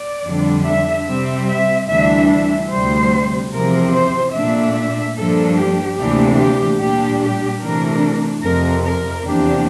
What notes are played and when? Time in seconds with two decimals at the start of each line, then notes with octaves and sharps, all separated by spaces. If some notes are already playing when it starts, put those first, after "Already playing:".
Already playing: D5
0.25 F2 D3 G3 D4
0.66 E5
1.07 C3 G3 C4 E5
1.47 E5
1.88 D2 C3 E3 G3 D4 E5
2.29 E5
2.69 D2 C3 G3 C5
3.52 E2 C3 F3 C4 A#4
3.93 C5
4.33 A#2 A3 D4 E5
4.74 E5
5.15 G2 F3 A#3 D4 A4
5.56 G4
5.97 D2 C3 E3 A#3 D4 G4
6.38 G4
6.79 A#2 G3 D4 G4
7.20 G4
7.61 C3 E3 A3 D4 A#4
8.42 F2 C3 F3 A#4
8.84 A#4
9.24 E2 C3 F3 A#3 D4 G4